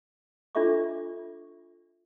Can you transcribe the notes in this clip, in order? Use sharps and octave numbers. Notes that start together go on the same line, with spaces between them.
D4 F4 A4 E5 C#6 D6